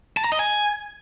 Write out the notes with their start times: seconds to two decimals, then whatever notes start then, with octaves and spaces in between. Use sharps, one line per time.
0.17 A5
0.24 A#5
0.32 D#5
0.39 G#5